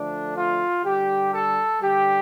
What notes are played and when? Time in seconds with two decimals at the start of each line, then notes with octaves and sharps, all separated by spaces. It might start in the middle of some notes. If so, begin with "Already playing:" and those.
Already playing: D3 F3 A3 D4
0.35 F4
0.84 D3 G3 G4
1.32 A4
1.82 D3 G3 G4